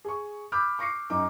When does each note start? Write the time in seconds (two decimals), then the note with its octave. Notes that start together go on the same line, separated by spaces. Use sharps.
0.05 G#4 C#6
0.52 B5 D6 E6 F6 G6
0.79 C#6 D6 A#6 C7 C#7
1.10 F#2 D#4 D6